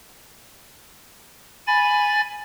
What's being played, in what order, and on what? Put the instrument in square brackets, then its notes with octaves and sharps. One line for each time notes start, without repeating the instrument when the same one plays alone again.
[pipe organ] G#5 B5 A6